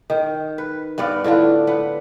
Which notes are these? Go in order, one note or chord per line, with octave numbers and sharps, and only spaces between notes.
D#3
B4
G2 B3 D5 F5
A2 D3 D4 F4
B3